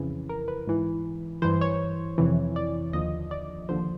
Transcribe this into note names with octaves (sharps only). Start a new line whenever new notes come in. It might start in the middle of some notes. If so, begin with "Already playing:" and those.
Already playing: F2 C#3 E3
A#4
B4
G#2 E3
G2 E3 C5
C#5
F2 C3 E3
D5
D#2 D3 F3 D#5
D5
D#2 D3 F3 C5